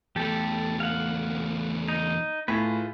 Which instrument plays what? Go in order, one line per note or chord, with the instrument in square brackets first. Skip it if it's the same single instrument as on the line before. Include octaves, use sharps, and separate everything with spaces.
[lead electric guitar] E2 A3 [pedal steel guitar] G4 A4
[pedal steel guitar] F5 F#5
D#4
[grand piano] A2 [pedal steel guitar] F4 G#4 B4